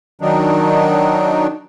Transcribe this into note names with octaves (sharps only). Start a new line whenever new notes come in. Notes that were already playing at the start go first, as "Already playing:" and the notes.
D#3 F#3 D4 D#4